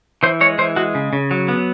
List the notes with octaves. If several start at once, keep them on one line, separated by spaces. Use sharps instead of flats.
E3 C5
G#3 C#5
E3 C5
G#3 F#4
C#3
C#3
F#3
B3